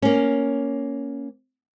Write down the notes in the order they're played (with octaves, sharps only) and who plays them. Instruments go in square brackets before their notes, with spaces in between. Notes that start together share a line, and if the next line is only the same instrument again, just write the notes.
[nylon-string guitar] A#3 C#4